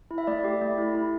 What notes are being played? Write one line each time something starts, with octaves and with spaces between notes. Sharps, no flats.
E4
E5
A3 D5
G4
A3
E4
E4